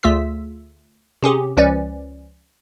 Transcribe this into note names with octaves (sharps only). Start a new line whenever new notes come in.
D2 A3 F4 G#4 E6 B6
C3 C#4 G4 G#4
C#2 F3 C#4 B4 D5